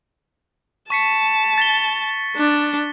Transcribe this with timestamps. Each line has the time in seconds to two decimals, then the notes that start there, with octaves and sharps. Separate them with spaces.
0.90 A5 C#6 B6 C#7
1.58 A6 B6 G7
2.36 D4